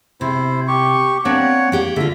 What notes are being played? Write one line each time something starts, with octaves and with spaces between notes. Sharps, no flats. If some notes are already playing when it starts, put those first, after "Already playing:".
C3 E4 C5
G4 C#6
A#3 C4 D4 C#5 F#5
A#3 G4 F#5
D3 F4 E5